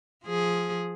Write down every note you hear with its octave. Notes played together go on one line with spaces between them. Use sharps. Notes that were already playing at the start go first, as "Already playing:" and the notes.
F3 G#4